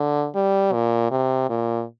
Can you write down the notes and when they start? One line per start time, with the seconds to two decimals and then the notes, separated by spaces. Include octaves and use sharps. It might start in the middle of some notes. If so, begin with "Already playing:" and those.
Already playing: D3
0.35 G3
0.73 A#2
1.11 C3
1.49 A#2